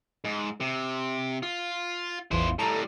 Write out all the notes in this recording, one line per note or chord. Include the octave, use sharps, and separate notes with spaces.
G#2
C3
F4
A1 E2 E4 F4 C5
A2 G3 A4 A#5